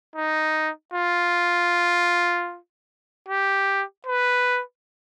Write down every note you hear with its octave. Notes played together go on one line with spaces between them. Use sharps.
D#4
F4
G4
B4